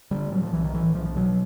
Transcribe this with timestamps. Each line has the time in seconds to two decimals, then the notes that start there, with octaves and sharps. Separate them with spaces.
0.11 D3 G3
0.31 A2 F#3
0.43 F3
0.52 B1 E3
0.64 D#3
0.74 A2 E3
0.95 B1 F3
1.06 F3
1.16 B2 F#3